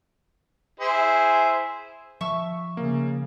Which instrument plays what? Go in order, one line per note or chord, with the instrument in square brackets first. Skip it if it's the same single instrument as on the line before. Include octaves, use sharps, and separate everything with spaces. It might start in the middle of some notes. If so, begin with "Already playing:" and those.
[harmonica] E4 G#4 C5
[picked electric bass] F3 [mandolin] E5 C#6 E6
[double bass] C#3 [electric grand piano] A#3